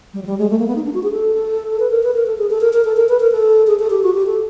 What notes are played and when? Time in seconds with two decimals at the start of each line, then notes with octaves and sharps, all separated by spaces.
0.14 G3
0.23 F#3
0.26 G3
0.39 G#3
0.50 A3
0.59 A#3
0.68 B3
0.76 D#4
0.85 D4
0.94 F#4
1.03 G#4
1.12 A4
1.80 B4
1.90 A#4
2.03 B4
2.14 A#4
2.26 A4
2.38 G#4
2.50 A4
2.61 A#4
2.73 A#4
2.85 A4
2.97 A#4
3.09 B4
3.20 A#4
3.31 A4
3.67 G#4
3.79 A4
3.90 G4
4.03 F#4
4.15 G4
4.27 A4